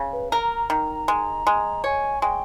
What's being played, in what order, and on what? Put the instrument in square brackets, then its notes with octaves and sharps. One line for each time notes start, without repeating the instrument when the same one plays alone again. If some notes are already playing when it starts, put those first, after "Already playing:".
Already playing: [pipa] C#3
[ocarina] B4
[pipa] A#4 [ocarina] A#5
[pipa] D#3
G#3
G#3
[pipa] C#5 [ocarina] G#5
[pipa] G#3 [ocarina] G5